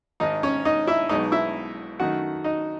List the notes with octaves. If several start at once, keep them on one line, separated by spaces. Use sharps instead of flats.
G#1 G#2 D#3 D#4 D#5
C#4 C#5
D#4 D#5
E4 E5
B1 B2 G#3 D#4 D#5
E4 E5
F#2 D#3 A3 D#4 F#4 F#5
D#4 D#5